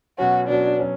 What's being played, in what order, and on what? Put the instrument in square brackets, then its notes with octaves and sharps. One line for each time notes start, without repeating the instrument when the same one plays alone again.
[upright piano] B2 F#3 C#4 [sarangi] F#4
[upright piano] B2 F#3 C#4 [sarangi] D4
[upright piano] F#3 C#4